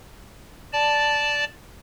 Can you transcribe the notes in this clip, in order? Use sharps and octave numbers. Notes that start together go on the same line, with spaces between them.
D5 A5